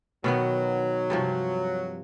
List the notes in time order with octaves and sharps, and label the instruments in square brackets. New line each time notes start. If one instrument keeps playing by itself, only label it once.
[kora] B2 D#3 B3 [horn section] F#3
[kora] G2 C3 F3